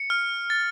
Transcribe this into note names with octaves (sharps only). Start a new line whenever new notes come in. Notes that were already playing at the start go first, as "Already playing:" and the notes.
Already playing: C#7
F6
A6